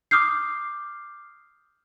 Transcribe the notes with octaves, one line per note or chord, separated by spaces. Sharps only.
D6 D#6 F6 G6 C7